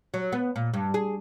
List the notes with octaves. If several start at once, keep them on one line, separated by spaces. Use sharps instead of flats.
F#3
B3
A#2
G2
G#4